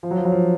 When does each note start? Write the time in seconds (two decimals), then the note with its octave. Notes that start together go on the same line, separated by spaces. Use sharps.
0.03 F3
0.11 F#3
0.17 F3
0.25 F#3
0.32 F3